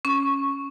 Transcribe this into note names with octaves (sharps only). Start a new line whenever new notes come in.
C#4 C#6